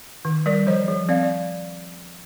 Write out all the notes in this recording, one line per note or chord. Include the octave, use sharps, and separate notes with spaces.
D#3
G3 A#4 D5
F3 C5 D#5
F3
C4 D5 F5
D5